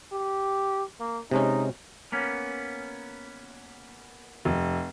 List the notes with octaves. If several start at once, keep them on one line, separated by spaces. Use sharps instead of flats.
G4
A#3
C3 G#3 C#4 D#4
A#3 B3 C#4
F1